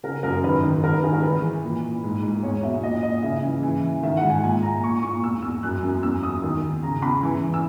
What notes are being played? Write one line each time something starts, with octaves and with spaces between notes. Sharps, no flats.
C#3 A#4
F#2 A#4
D#3 B4
D#3
D#3 A#4
B4
D#3 G#4
A#4
E3 B4
E3
A#2
A#2
G#2
G#2
E2 C#5
B2 E5
A#2 D#5
A#2 D#5
C#3 E5
E3
E3
E3
D#3 E5
F#5
G#2
G#5
A#2 G#5
A#2 A#5
A#2 C#6
A#2 C#6
E2 E6
E2 E6
F#2 F#6
F#2
E2 E6
E2 D#6
D#3
E2
C#3 A#5
E2 B5
E3
E3
E6